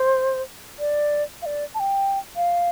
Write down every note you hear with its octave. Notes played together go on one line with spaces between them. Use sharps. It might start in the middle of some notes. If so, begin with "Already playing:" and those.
Already playing: C5
D5
F5
D5
A5
G5
F5